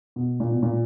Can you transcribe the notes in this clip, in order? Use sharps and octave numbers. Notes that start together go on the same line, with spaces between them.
B2
A#2
B2
A#2